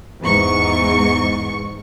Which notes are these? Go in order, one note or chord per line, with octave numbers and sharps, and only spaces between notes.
E2 G#2 C#6